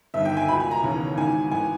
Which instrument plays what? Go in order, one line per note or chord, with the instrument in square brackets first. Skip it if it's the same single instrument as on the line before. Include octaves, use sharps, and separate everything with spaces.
[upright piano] G1 G2 D#3 E5
G5
G#5
C#2 B2 B5
G#5
A#5
E1 D#2 C#3 E3
G#1 G#2 E3 G#5
G#1 E3 G#5